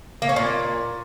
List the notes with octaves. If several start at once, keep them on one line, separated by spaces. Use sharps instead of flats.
A#3
C#4
A#2